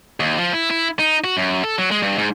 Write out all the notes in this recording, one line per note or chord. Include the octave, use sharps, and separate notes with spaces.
D#2
F3
E4
E4
D#4
F#4
F#2
A4
F#3
G#3
G2
G#2